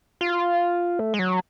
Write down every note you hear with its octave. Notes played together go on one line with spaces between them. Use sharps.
F4
A3
G#3
F#3